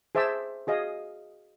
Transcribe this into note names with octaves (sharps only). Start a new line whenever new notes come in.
G#4 C5 E5 A5 D6 E6
F#4 G#4 D#5 F5